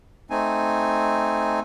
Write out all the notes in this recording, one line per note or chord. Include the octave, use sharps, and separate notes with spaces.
A3 C4 D#4 G#5